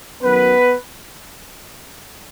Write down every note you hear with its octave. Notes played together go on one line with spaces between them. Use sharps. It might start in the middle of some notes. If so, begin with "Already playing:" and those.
F#2 D#3 F#3 B3 B4